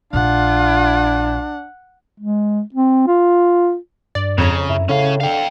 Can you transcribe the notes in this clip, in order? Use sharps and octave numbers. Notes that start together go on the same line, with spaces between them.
A#1 D4 F4 F#5
G#3
C4
F4
G2 D5
F2 C#3 C#5 A#5
F#2 E4
A2 C#3 C#4 F5
D3 F5 G5